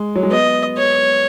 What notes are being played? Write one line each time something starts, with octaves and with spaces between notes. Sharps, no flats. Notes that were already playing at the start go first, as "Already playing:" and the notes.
Already playing: G#3
F#3
G#3
B3 D#5
C#5